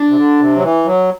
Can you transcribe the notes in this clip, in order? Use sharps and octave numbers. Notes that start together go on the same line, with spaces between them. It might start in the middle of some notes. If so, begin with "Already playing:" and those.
Already playing: D4
C3
D3
C3
F#3
E3
F#3